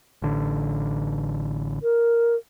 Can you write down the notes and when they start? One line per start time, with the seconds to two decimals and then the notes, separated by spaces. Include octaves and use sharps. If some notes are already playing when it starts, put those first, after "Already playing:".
0.22 A1 D3
1.82 A#4